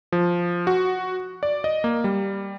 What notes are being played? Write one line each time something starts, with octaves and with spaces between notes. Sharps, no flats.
F3
F#4
D5
D#5
A#3
G3